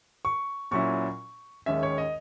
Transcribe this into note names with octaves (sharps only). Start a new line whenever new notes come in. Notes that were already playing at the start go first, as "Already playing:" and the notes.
C#6
A#2 F#3 C#4 E4 C#6
D#2 D#3 G#3 C#4 E5
C#5
D#5